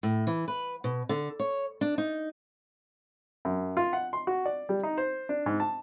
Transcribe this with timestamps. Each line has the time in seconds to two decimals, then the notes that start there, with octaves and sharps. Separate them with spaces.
0.03 A2
0.27 E3
0.48 B4
0.84 B2
1.09 D3
1.40 C#5
1.81 D4
1.98 D#4
3.45 F#2
3.77 F4
3.93 F#5
4.13 C6
4.27 F#4
4.45 D5
4.69 G3
4.83 D#4
4.98 C5
5.29 D4
5.46 G#2
5.60 A5